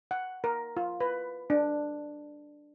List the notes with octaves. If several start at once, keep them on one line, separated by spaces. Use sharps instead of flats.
F#5
A#4
F4
B4
D4